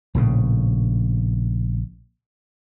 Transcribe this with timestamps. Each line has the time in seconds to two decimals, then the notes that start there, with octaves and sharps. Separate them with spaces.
0.15 A#1 A2 C#3